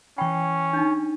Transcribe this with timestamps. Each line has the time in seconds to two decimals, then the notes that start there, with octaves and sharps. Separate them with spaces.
0.18 E3 C#4 G5 B5 C#6
0.73 D4 D#4